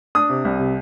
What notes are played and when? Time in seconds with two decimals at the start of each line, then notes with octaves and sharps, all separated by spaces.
0.15 D4 D#6
0.29 C3
0.45 C2
0.59 C3